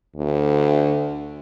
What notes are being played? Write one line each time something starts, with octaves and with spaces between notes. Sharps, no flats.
D2